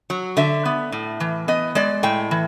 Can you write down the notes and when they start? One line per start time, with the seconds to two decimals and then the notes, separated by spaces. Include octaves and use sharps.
0.10 F#3
0.37 D3 E5
0.65 B3
0.92 A2
1.20 E3
1.48 B3 D#5
1.75 G#3 D5
2.03 A2 G5
2.31 E3